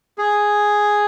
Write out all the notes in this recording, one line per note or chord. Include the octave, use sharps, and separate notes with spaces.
G#4